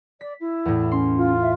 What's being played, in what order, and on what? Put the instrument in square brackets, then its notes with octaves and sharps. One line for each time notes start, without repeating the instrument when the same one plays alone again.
[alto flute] D5 [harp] B6
[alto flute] E4
[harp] E2 A2
[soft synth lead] C#4 [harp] C6
[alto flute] F4
[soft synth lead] E5